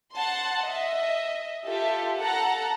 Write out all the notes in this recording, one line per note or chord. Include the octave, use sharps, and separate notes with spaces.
F#5 A5 C6
D#5 E5
F4 G4 A4 E5
A4 F#5 A5 A#5